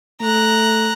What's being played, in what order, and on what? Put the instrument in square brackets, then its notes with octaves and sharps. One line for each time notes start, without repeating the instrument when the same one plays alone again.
[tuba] A3 [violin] A#5 F#6